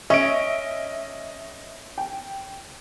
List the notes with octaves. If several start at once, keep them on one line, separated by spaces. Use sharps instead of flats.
C#4 D#5 E5 D7
G5